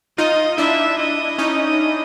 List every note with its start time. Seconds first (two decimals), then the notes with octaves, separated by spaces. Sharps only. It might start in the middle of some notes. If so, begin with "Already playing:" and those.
0.18 D#4 F4 D#5
0.58 D4 E4 E5
0.99 D#5
1.38 C#4 D#4